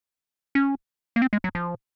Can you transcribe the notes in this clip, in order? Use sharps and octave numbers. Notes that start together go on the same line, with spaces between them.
C#4
A#3
C4
G#3
F#3
F3